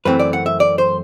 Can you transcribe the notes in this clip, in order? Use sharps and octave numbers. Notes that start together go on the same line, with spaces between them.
F#2 E3 A3 C4 B4
D5
F#5
E5
D5
C5